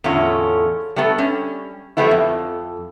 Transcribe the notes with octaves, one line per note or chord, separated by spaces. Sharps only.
E2 A2 D3 C#4 F4
G3 A3 B3 A4
G3 C#4
F3 G3 A3 B3 E4
F2